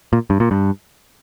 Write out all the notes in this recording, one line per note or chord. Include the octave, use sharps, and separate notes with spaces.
A#2
G2
A#2
G2